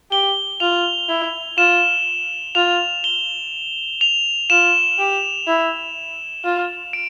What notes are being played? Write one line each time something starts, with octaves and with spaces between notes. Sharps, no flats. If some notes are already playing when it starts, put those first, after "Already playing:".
G4 G7
F4 F7
E4
F4 E7
F4 F7
G7
F7
F4 E7
G4
E4
F4
D7